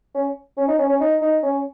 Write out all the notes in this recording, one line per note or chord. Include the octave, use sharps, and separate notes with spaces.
C#4
C#4
D#4
C#4
C#4
D#4
D#4
C#4